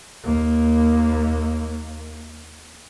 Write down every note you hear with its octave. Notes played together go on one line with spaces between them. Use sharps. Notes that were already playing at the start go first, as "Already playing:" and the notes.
D#2 A#3